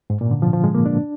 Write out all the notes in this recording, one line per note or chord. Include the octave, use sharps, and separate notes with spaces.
G#2
A#2
D3
F3
F3
G#3
A#3
D4